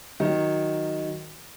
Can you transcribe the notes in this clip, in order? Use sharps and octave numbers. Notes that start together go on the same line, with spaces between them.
D#3 F#3